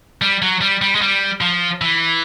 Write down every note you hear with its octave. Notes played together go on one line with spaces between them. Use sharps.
G3
F#3
G3
G3
G#3
G3
F3
E3